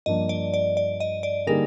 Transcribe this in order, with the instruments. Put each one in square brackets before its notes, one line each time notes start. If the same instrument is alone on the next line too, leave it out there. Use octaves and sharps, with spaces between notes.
[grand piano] G2 F3 A#3 D4 [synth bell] D#5
[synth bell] D5
D5
D5
D#5
D5
[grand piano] D3 G3 A#3 D#4 G#4 [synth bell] A#4